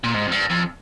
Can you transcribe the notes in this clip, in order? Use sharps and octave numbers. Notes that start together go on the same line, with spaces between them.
A#2
G#2
F2
G2
F2